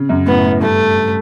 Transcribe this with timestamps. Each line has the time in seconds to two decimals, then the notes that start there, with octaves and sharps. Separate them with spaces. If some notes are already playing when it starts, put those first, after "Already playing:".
Already playing: C#3
0.09 F#2
0.26 A2 B3
0.44 A2
0.62 G2 A3